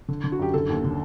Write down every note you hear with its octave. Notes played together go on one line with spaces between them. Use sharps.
D3
D3
F#4
F#2 G4
D3 A4
D#2
D3